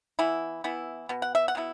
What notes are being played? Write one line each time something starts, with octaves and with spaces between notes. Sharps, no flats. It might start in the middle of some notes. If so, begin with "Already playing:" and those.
E3 B3 E4
E3 B3 E4
B2 B3
F#5
E5
F#5
B2 B3 E4